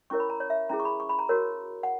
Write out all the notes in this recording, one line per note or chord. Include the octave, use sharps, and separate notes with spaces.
C#4 E4 A#4 C#5 C#6
B5
A#5
C#5
E5
C#4 E4 G#4 A#5
C#6
B5
C#6
B5
A#5
F#4 A#4 C#5
F#5